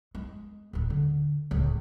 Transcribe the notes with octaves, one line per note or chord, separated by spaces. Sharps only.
G#3
D#1 D#4
D3
D1 C#2